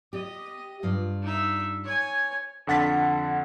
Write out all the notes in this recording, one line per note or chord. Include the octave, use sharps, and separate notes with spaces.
G4 D#5
G2 F4 D5
D#4 E5
C#5 G#5
F2 D3 F#5 A6 B6